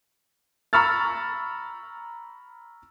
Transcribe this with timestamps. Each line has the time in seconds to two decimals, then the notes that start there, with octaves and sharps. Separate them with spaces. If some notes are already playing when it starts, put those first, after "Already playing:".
0.73 A#5 B5 C#6 E6 F6 A6